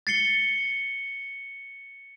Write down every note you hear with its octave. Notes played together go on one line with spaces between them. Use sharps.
A6 C7 C#7 G7